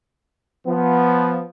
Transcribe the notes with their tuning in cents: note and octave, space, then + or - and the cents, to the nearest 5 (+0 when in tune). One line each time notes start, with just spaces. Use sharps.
F3 +0 B3 +0